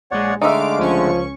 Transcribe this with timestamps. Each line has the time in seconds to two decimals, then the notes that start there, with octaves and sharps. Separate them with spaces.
0.11 A#1 G#3 C#5 D5 F#5
0.41 D3 G#3 A3 D#4 E5 F5 D6 D7
0.79 C#2 F3 C#4 C#6